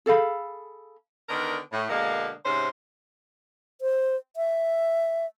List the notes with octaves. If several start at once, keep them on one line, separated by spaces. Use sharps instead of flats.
G#4 A4 F5 B5
D3 D#3 B3 D4 A#4
A2
B2 D3 G#3 A#3
G#2 C3 C#4 C5
C5
E5